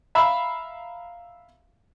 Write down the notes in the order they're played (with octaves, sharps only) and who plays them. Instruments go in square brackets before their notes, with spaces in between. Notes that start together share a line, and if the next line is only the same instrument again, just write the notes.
[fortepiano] E5 F5 A#5 B5 E6